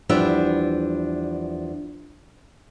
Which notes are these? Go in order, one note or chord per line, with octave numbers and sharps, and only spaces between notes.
E2 F3 G3 D4 B4 E5